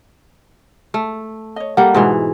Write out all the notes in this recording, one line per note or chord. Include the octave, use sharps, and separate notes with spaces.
A3
C#5 D#5
G3 A#3 A4 D#5 F#5
G#2 B2 E3